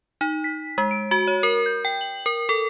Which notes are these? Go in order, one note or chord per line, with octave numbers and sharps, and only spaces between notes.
D#4
B6
G#3
D7
F#4
C#5
A#4
G6
G5
F#7
A#4
A4